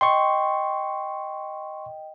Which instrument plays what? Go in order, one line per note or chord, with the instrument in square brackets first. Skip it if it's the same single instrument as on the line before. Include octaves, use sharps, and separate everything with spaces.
[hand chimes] D#5 G5 [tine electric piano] C6 C#6